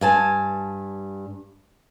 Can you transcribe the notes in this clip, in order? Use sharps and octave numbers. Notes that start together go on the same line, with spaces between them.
G2 G#5 A5